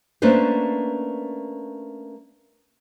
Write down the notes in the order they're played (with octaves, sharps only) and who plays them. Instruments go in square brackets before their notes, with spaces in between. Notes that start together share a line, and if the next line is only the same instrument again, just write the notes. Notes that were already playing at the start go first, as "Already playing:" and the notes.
[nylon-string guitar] A3 A#3 C#4 D4 B4 C5